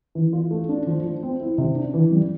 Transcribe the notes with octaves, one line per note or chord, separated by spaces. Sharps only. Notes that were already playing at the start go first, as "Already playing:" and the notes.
E3
F4
A3
D4
F3
F3
C4
E4
C3
D4
E3
G3